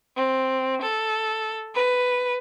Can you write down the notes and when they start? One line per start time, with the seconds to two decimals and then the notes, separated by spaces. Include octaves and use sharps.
0.16 C4
0.82 A4
1.75 B4